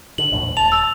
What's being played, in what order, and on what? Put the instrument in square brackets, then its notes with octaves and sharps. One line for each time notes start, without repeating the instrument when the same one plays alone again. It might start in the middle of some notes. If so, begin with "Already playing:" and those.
[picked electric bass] D3 [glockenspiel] F#7
[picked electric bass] A#1 E2 A2
[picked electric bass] E1 [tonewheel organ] A5 [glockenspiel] F7
[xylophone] E6